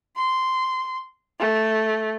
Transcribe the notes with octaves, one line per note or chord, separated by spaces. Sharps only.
C6
A3